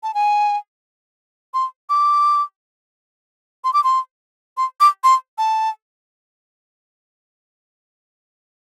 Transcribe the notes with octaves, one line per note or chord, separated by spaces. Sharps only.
A5
G#5
C6
D6
C6
D6
C6
C6
D6
C6
A5